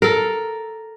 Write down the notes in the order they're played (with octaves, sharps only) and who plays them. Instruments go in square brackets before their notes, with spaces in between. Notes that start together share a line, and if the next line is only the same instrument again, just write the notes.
[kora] A4 A#4